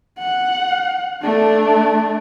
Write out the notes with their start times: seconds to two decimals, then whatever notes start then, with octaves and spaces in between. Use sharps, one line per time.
0.19 F#5
1.22 A3 D4